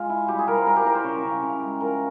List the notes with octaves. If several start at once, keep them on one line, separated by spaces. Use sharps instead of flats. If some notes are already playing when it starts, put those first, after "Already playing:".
Already playing: G#3 F4
E4
G3 G4
G#4
G3 A#4
C5
G3 A#4
G4
E4 A#4
C5
C#3 C#5
C#3
C#3
G#3
F3 A#4